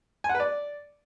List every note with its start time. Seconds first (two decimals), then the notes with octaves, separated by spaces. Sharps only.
0.24 G#5
0.29 F#5
0.35 B4
0.40 D5